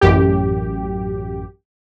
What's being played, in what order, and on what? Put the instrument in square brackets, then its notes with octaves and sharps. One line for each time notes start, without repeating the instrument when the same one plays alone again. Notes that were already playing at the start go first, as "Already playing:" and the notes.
[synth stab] A1 F#2 G4